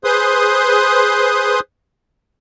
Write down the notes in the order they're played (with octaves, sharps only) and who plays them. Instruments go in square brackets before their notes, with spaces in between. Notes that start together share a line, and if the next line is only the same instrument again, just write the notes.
[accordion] G#4 B4 C5 C6 D#6